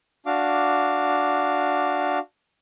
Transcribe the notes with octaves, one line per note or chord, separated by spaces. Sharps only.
D4 F#4 F5 D6